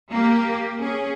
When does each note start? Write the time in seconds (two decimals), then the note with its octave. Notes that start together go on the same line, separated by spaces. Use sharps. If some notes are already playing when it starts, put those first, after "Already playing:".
0.12 A#3 G4
0.80 C#4 G#4